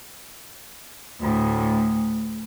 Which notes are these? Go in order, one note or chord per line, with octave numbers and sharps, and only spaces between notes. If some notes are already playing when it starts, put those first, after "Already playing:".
D2 A2